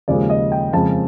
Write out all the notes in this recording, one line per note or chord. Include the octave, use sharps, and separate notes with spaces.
D#2 C#3 F3 G#3 D5
D#5
G5
F2 C#3 F3 G#3 A5